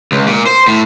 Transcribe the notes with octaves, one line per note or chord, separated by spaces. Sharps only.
C#2
A#2
C5
A2